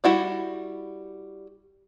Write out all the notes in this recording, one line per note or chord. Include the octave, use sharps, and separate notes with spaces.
G3 E4 F#4 D5